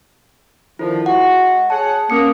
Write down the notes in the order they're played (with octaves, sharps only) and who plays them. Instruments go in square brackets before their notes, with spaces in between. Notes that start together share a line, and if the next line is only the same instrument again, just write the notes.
[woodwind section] D3 D#3 F3 [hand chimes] E4 F4
[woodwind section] G#3 F#4 [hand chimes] F#5
[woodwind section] G#4 C#5 F#5 [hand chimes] A5
[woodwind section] A#3 [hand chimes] C#4 D#6 C#7